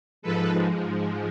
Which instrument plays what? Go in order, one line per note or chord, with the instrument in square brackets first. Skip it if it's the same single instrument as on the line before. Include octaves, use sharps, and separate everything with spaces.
[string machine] G#2 F3 G#3 A4 B4